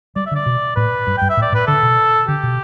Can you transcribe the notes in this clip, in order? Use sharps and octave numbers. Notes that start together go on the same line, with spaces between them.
G3 D5
E5
D3
D5
B2
A2 B4
G2
G2 G5
E5
A2
D5
A2
B4
D3 A4
B2
D3 G4
B2